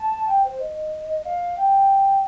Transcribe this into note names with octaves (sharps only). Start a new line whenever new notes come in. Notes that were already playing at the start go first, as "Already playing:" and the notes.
Already playing: A5
G5
C5
D#5
F5
G5